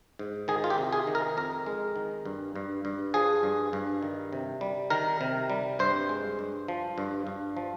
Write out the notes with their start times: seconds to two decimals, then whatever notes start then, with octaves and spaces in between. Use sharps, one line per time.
0.19 G#2
0.48 D#3 G#4
0.64 F4
0.70 G4
0.78 C3
0.93 G#4
1.07 D#3
1.15 A#4
1.37 F2 A#4
1.66 G#3
1.96 D#3
2.25 G2
2.55 G2
2.85 G2
3.14 F3 G#4
3.43 G2
3.73 G2
4.03 D#3
4.33 C3
4.61 G3
4.90 D#3 A#4
5.21 C3
5.50 G3
5.79 G2 C5
6.09 G#3
6.39 G2
6.68 F3
6.98 G2
7.27 G2
7.57 F3